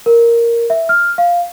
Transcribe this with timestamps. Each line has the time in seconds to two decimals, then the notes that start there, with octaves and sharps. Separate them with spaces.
0.06 A#4
0.70 E5
0.89 F6
1.18 F5